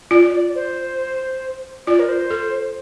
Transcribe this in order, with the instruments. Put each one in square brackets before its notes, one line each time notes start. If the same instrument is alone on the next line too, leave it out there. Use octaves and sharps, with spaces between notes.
[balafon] F4 [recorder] D5
[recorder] D5
C5
[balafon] F4 [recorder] D5
[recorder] A#4
C5
[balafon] A4